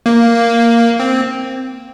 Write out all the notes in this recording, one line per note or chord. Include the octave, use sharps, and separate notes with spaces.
A#3
C4